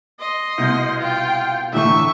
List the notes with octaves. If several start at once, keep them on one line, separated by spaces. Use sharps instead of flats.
D#5 C6
C2 B2 G6
F4 G5
E2 A2 D3 E5 C#6